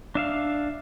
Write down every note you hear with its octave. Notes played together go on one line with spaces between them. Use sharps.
D4 E5 F5